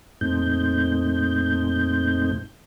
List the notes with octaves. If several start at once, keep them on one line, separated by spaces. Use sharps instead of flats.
F2 A#2 A3 C4 D#4 G6